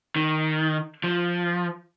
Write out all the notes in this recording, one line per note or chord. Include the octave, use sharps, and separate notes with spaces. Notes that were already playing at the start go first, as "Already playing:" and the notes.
D#3
F3